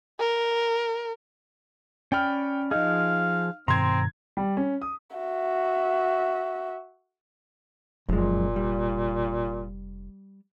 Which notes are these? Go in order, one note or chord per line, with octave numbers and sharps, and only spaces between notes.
A#4
C#4 D5 G5 B5 F6
F3 D#4 G#4 F5
G2 B2 D#3 C4 A#5 C6 G#6
G3
C#4
D#6
F#4 E5
F1 F#2 A#2 F3 G#3
G3